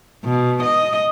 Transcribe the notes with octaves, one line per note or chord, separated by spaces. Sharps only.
B2
D#5